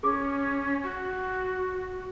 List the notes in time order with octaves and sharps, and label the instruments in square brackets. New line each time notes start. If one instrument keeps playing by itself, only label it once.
[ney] C#4 [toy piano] G#4 D6
[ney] F#4